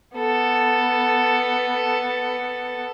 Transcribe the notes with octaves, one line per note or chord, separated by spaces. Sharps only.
B3 A4